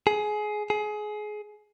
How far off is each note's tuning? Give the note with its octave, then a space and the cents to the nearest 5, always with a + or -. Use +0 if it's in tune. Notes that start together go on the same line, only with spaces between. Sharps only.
G#4 +20
G#4 +25